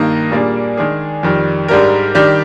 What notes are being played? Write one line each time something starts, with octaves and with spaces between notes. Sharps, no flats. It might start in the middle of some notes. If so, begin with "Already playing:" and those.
Already playing: G2 D#3 A#3 D#4
A#2 G3 A#3 D4 G#4
D#3 G#3 D4 G#4
F2 D#3 G3
G#2 G3 D4 G4 A#4
D#3 G3 D4 G4